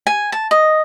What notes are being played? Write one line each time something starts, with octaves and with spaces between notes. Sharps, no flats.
G#5
A5
D#5